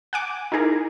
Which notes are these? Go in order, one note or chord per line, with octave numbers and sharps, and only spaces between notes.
F#5 G#5 D6
D#4 E4 G#4 A#4